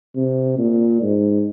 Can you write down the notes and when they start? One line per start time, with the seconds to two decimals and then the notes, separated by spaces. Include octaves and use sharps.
0.16 C3
0.58 A#2
1.02 G#2